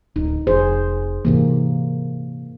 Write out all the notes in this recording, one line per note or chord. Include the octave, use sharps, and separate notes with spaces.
D1 D#4
F1 G#4 C5
G#2 C3 E3 A#3